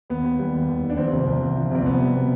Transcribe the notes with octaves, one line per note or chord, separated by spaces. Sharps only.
D#2 B3
D#2
G3
D#2
D#2
D#2
D4
F3 C4
C2
C2
F3
F3
C2 C4
C2 B3
G3
B2